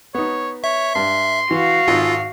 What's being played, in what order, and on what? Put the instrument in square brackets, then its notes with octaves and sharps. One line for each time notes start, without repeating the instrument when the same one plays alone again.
[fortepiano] B3 D#4 [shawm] C#5
[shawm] C#5 [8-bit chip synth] E5
[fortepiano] G2 [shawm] C6
[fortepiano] E3 [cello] F#4 F5
[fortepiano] G#1 G#2 [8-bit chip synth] F4 [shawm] A4